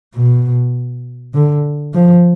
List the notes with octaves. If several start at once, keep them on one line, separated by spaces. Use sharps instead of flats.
B2
D3
F3